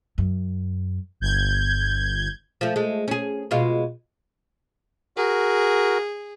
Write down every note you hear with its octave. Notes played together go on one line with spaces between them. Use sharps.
F#2
G1 G6 G#6
F3 A3
G#3 A3
C#4 G#4
B2 G#3 F4
F#4 G#4 A#4